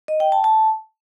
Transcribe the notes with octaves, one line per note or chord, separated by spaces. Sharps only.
D#5
G5
A5
A5